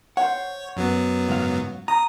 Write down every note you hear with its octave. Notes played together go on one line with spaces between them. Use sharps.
C5 C#5 F#5
F#2 F#3 B3
C#2 G#2 F5
A#5 D#6